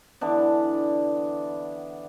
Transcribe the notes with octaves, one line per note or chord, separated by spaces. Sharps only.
D3 E3 B3 D4